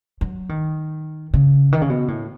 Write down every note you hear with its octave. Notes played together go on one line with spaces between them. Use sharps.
F#3
D#3
C#3
D#3
C#3
B2
A2